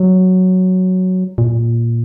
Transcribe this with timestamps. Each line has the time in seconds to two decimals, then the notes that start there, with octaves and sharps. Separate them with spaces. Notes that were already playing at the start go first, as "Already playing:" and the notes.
Already playing: F#3
1.38 A#2